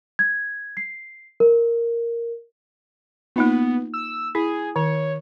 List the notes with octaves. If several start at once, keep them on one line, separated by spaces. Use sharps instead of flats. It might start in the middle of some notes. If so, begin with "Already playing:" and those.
G#6
C7
A#4
A#3 B3 D#4 F4
E6
E4 G#4
D#3 C#5